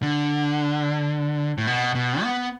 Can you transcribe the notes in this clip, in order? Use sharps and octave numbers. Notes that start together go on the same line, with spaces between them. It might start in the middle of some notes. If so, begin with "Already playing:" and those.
D3
A2
B2
B2
B3